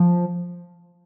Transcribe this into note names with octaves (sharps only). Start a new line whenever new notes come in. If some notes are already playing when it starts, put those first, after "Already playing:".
Already playing: F3